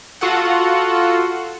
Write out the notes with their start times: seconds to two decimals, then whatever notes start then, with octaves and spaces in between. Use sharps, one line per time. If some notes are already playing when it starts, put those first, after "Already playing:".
0.21 F4 F#4 A4 F#5